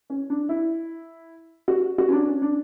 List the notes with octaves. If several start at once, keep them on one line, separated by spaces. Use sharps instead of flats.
C#4
D4
E4
F#4
F#4
C#4
D4
C#4
D4